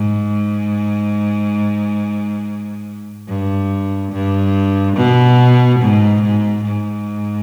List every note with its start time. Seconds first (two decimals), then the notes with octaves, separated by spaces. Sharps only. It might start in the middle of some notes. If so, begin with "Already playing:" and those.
Already playing: G#2
3.28 G2
4.12 G2
4.96 B2
5.80 G#2
6.22 G#2
6.64 G#2